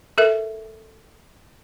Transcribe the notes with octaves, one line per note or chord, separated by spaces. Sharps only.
A4 A#4 E5